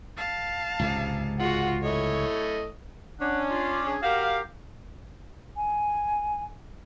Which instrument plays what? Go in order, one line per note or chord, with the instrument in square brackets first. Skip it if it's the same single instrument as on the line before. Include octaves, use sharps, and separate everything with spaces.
[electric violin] F5 A5
[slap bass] C#2 G#2 C3
[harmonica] G#3 F#5 [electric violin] F4 F#4
[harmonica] A3 E4 D#5 [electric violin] C#5
[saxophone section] C#4 D4 [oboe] F#5
[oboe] F4
G#4
[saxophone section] F#4 A#4 F5 [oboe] G4
[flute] G#5